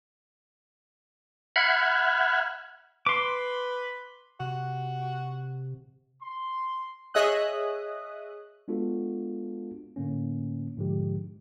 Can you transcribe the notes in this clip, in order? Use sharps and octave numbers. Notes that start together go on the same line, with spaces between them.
E5 F#5 B5 F6 F#6 G#6
B4 C6 D6
C3 F#4
C6
G#4 C#5 D#5 E5 D#6 F#6
G#3 B3 D4 F4 F#4 A4
A2 D3 A#3 C#4
G#2 B2 D3 F3 G#3 G4